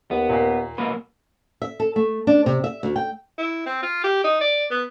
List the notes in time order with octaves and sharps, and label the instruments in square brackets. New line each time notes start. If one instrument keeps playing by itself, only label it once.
[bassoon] D#2 [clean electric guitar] B3
[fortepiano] A#2 A#3
[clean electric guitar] B1 A#3 B4
[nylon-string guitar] E5
A4
A3
D4
C3
E5
D2
G5
[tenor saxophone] E4
C4
F4
G4
D#4
D5
B3